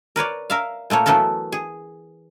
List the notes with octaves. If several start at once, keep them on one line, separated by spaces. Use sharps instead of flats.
A#4 B4 C#5 D5
A#4 E5 F5
A#2 A3 A#3 C#5
E3 F#3 A3 B3 A4 A#4
G#4